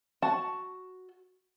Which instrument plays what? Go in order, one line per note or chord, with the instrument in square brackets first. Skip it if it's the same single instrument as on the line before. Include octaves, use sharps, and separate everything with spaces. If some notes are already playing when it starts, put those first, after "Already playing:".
[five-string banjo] F#4 A5